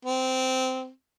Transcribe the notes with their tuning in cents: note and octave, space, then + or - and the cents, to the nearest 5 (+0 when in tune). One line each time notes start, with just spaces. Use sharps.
C4 -15